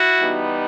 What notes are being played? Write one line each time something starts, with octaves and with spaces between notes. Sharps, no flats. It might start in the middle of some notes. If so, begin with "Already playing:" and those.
Already playing: E4 F#4
E3 G3 B3 D#4